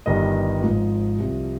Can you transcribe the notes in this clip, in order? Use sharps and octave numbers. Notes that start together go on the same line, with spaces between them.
G1 G2 D#3 G3 D#5
G#1 G#2 F3
C2 C3 F3